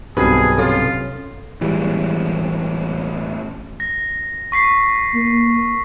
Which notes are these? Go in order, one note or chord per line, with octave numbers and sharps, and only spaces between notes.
B1 G2 C4 F#4 G#4 B4
C3 C#4 F4 A4
A1 E3 G3 G#3
A#6
C#6 B6 C7
A#3